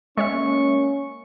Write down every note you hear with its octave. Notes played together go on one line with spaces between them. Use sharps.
G#3 A#3 C#4 C#5 E5 C#6